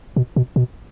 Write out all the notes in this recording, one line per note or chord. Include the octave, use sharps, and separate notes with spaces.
B2
B2
B2